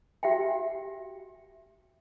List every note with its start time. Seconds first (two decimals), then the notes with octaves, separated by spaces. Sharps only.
0.23 F#4 G4 E5 F#5 G5